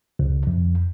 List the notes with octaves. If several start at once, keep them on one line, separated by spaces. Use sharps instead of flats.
C#2
F2